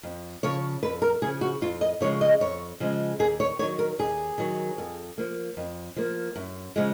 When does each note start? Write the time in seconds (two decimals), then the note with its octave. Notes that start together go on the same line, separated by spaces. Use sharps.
0.03 F2
0.43 C#3 F3 C#5
0.83 F2 B4
1.02 A#4
1.22 C#3 F3 G#4
1.41 F#4
1.61 F2 F4
1.81 D#5
2.01 C#3 F3 G#3 C#5
2.21 D#5
2.40 F2 C#5
2.80 C#3 F3 G#3
3.19 D#2 G#4
3.40 C#5
3.59 D#3 F#3 C#5
3.79 A#4
3.99 D#2 G#4
4.38 D#3 F#3
4.78 F2
5.18 F3 A#3
5.57 F2
5.96 F3 A#3
6.36 F#2
6.76 C#3 F3 G#3